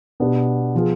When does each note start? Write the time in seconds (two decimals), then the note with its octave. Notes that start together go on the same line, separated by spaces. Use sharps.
0.20 B2 B3 D4 G4
0.75 F3 B3 F4 G#4